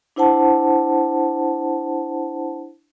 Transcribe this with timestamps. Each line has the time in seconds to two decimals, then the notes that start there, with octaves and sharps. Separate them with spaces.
0.16 D4 E4 C5 F#5 A5